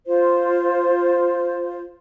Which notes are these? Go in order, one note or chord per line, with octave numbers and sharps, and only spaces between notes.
F4 C5